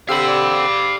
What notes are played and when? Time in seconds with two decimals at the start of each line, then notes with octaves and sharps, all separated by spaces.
0.09 D3 C4 G4 F5 B5 E6
0.28 D5